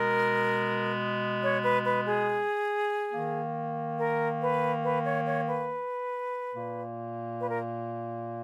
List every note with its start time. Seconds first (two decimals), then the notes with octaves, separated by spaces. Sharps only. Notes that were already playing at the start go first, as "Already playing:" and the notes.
Already playing: B2 G#3 B3 A#4
1.43 C#5
1.64 B4
1.85 B4
2.06 G#4
3.13 D#3 A#3
3.98 A#4
4.42 B4
4.84 B4
5.05 C#5
5.26 C#5
5.48 B4
6.55 A#2 A#3
7.40 B4
7.49 A#4